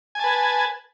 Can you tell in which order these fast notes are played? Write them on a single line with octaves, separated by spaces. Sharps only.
G#5 A5 B4